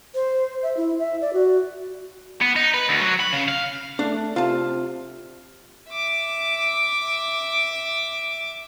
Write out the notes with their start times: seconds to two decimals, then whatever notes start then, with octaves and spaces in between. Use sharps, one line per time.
0.14 C5
0.62 E5
0.77 E4
0.99 E5
1.21 D5
1.33 F#4
2.41 B3
2.56 D#4
2.74 B4
2.89 D2
3.01 F#3
3.20 B5
3.32 C#3
3.48 F5
3.99 A3 D4
4.36 C3 F4 A5
5.89 E5 D6